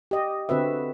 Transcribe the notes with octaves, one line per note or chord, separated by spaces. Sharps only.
G4 D#5
D3 C4 F#4 B4 E5